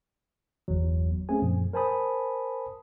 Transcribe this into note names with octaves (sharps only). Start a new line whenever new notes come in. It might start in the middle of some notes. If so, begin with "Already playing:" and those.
G1 E2 F#3
A3 C4 C#4 G#4 G#5
F#2 A#2 F3
A#4 C5 G#5 A5 B5 D#6